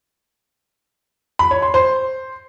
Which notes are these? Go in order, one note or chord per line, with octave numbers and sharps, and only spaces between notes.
B5
C#5
C6
C5